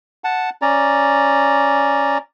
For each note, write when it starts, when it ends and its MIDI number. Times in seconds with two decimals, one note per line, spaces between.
0.24 0.50 78
0.24 0.50 81
0.62 2.18 61
0.62 2.18 74
0.62 2.18 82